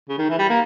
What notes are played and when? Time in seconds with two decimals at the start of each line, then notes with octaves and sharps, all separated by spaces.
0.09 C#3
0.18 D#3
0.30 E3
0.39 G3
0.49 A#3